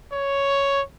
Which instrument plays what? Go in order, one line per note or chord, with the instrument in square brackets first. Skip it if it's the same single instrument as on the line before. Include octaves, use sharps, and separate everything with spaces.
[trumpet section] C#5